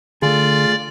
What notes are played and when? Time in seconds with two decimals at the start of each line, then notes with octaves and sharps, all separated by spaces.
0.22 D3 A3 F4 G#4 D5